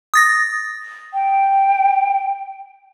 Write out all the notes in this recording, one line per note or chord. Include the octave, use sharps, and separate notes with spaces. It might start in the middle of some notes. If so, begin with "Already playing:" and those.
D#6 A6 A#6
G5